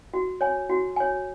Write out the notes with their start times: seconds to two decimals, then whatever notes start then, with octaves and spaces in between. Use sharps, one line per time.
0.14 F#4
0.41 C#5 G#5
0.69 F#4
0.96 C#5 G#5